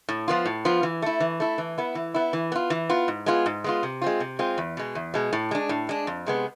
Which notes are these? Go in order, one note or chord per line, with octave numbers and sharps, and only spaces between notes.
A2
F3 B3 F4
A2
F3 B3 F4
E3
A3 E4
E3
A3 E4
E3
B3 E4
E3
B3 E4
E3
B3 F4
E3
B3 F4
G#2
G#3 B3 F4
G#2
G#3 B3 F4
C3
G#3 C4 F4
C3
G#3 C4 F4
E2
B2 G#3
E2
B2 G#3
A2
G#3 D4
A2
G#3 D4
F2
C3 G#3 B3